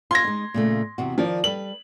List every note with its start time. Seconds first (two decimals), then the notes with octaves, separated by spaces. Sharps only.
0.11 F4 C6 G#6 A#6
0.24 G#3 D#4
0.54 A#2 C#3 A3
0.98 E2 C3 F#4
1.18 D#3 F3 D5
1.44 G3 A4 B4 F#7